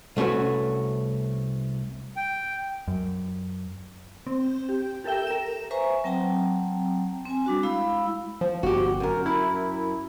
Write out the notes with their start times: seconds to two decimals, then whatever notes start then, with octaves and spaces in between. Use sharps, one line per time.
0.17 C2 A3 C#4 F#4 B4
2.16 G5
2.88 F#2
4.27 C4
4.69 G4
5.04 G4 A4 A#4 E5 G5
5.27 A#4 E7
5.71 B4 C5 E5 G#5 A#5 C#6
6.04 F#3 C4 G5 A5 A#5
7.25 C4 G#5
7.46 G3 D4 F#4
7.63 G#3 E4 F5 B5 E6
8.41 F3
8.63 G1 F#4 G4
9.00 F#2 A#4
9.26 E4